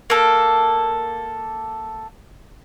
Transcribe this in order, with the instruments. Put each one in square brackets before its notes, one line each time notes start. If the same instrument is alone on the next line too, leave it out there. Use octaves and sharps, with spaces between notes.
[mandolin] A#3 A4